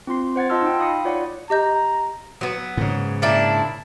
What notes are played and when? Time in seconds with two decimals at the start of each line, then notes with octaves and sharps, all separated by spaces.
0.07 C4 F4 C6 C7
0.36 C5 F#5 G#6 A6
0.49 F4 D#5 A5 C6 E6 F6
0.62 D#4 G5
0.79 F5 B5 D#6 A#6 C#7
1.05 F4 C#5 D5 F#5
1.50 G4 D#5 A#5 G6
2.41 F#3 B3
2.77 G#2 C#3
3.22 A#2 D4 E4